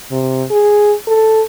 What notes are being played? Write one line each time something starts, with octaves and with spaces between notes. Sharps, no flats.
C3
G#4
A4